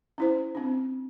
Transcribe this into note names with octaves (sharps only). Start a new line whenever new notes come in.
C#4 E4 C5
C4 D4